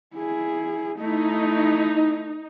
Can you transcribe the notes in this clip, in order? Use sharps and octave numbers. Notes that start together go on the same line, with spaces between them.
E4 G#4
A3 D#4 E4